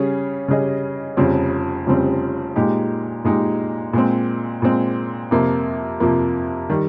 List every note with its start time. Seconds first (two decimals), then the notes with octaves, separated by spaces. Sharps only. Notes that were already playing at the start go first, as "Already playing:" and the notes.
Already playing: C#3 G3 C#4 G#4
0.48 C#3 G3 C#4 G#4 D#5
1.17 F1 F2 C#3 G3 C4
1.86 F1 F2 C#3 G3 C4
2.56 A#2 G#3 D#4 G4
3.24 A#2 G#3 D#4 G4
3.93 A#2 G#3 C4
4.62 A#2 G#3 C4
5.31 F2 C3 F3 A#3
6.00 F2 C3 F3 A#3
6.70 D#3 G3